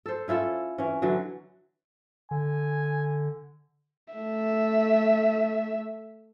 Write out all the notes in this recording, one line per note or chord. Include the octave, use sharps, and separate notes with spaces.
A4 C5
C#4 E4 F4 A4
E3 C#4
D3 E3 F#3
D3 G#5
A3 E5